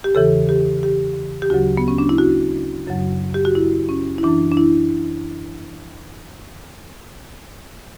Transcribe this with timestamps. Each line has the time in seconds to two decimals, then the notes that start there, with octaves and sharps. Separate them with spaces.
0.04 G4
0.15 E2 C#3 E3 A4
0.49 G4
0.83 G4
1.42 G4
1.50 D2 C#3 F#3 F#4
1.77 B3
1.88 C#4
1.98 D4
2.09 E4
2.18 F#4
2.87 F#2 C#3 F#3
3.34 G4
3.45 F#4
3.55 E4
3.89 C#4
4.18 E4
4.23 F#2 E3 D4
4.52 D4
4.57 E4